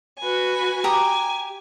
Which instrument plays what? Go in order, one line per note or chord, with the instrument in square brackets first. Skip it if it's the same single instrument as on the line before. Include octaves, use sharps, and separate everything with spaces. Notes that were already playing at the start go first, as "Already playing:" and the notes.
[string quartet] F#4 B4 G#5
[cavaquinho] G4 A#5 D#6 [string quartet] G#5